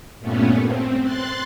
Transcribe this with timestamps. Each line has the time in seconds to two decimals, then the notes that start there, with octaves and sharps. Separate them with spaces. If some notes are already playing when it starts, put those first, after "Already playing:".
0.20 G2 A#2 A3 B3 C#4
0.61 C4
1.03 C6 F#6 A6